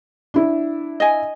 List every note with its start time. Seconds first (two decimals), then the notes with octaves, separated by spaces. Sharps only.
0.34 D4 E4
1.00 D#5 G#5